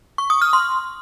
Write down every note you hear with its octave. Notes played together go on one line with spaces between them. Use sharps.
C#6
D#6
F6
C6